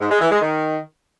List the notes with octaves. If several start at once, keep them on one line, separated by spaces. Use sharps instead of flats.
G#2
G#3
E3
G#3
D#3